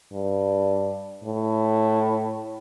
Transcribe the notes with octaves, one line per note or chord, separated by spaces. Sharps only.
G2
A2